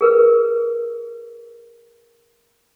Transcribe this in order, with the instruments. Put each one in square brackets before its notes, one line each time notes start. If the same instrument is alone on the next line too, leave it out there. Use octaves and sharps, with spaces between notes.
[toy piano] G#4 A#4 B4